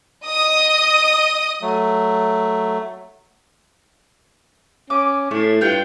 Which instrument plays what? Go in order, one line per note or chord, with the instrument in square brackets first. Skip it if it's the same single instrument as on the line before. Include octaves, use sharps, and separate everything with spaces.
[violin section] D#5 D#6
[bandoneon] F#3 A3
[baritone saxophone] C#4 [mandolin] D6
[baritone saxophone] A2 [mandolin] A3
[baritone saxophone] G2 [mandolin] F4 G5